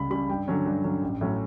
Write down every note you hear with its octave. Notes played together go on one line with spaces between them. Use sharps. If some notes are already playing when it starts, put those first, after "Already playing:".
Already playing: C#2 C#3 G3 B5
C#3 G3 B5
G2 G5
D3 F#3 C#4
G2
D3 F#3 C#4
A1
A2 F#3 C#4